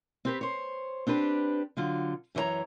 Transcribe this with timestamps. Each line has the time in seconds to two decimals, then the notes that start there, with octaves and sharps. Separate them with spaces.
0.25 C4 G4 B4
0.41 C5 C#5
1.07 C4 D4 G4 B4
1.77 D3 F#3 F4
2.35 F#2 E3 F#4 C#5 A#5